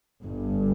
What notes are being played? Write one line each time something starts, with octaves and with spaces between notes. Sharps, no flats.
G1 G2